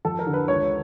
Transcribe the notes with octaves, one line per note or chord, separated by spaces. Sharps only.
F2 A4
A#4
D3
B4
C#2 C#5